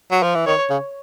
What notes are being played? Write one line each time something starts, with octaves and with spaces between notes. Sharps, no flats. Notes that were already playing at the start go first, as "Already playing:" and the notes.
F#3
F3
E3
D#3 C#5
C#3